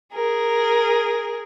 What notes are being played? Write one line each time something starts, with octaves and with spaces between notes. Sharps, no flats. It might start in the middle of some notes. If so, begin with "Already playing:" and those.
G#4 A#4